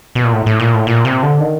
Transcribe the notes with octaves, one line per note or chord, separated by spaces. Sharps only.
B2
A#2
A2
A2
A#2
A2
A#2
C3
D3
D#3